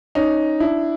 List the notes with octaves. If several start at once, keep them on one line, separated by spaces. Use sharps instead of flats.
C#4 D#4
D4 E4